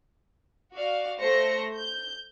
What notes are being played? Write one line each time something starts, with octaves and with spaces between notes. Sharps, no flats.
F#4 D5 F5
A3 C5 A#6 C#7
G6